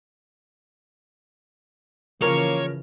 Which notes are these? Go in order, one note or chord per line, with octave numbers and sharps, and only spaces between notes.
C#3 E3 F3 A#3 C#4 A#4 C#5